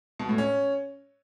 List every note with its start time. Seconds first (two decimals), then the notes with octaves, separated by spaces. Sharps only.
0.19 B2
0.29 A2
0.38 C#4